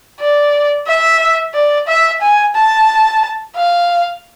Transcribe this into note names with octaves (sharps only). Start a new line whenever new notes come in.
D5
E5
D5
E5
G#5
A5
F5